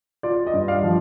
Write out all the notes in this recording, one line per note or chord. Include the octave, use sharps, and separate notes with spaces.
F4 D5
D#5
G2
D5 F5
F3